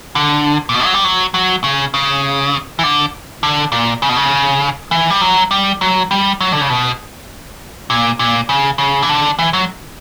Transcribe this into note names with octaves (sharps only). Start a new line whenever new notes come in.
D3
A#2
B2
F#3
G3
F#3
F#3
C#3
C#3
E3
D3
D3
A#2
C#3
B2
C#3
E3
G3
F#3
G3
F#3
G3
F#3
D3
C#3
B2
A#2
A#2
C#3
C#3
E3
D3
E3
F#3